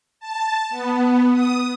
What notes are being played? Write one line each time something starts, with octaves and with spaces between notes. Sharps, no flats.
A5
B3
D#6